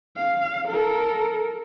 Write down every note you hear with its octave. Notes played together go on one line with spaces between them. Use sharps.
F5
A4 A#4